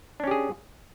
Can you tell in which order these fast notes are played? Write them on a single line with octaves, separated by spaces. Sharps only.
D4 C#4 G4 G#4